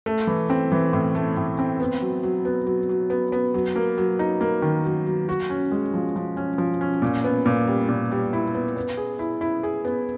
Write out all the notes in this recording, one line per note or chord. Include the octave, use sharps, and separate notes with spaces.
A3
E3
C4
E3
A2
A3
A2
C4
B3
F#3
F#3
B3
F#3
F#3
B3
B3
F#3
A#3
F#3
D#4
A#3
D#3
F#3
F#3
F#4
C#4
G#3
F3
F3
C#4
F3
C#4
A#2
B3
A#2
G3
A#2
G3
E4
B3
B3
G#4
E4
E4
G#4
B3